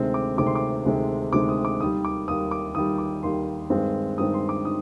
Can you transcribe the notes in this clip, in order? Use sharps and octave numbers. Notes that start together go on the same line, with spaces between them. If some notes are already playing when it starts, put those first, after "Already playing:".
Already playing: D2 C3 D#3 G#3 C4
D6
D2 C3 D#3 G#3 C4 D6
C6
D6
D2 C3 D#3 G#3 C4
D2 C3 D#3 G#3 C4 D6
D#6
D6
D#2 D#3 G3 D#6
D6
D#2 D#3 G3 D#6
D6
D#2 D#3 G3 D#6
D6
D#2 D#3 G3 C6
G2 D#3 G#3 C4
G2 D#3 G#3 C4 D#6
C6
D6
D#3 D#6